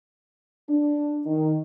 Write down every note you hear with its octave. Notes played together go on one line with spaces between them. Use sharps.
D4
D#3